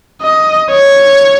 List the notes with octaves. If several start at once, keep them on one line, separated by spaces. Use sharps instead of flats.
D#5
C#5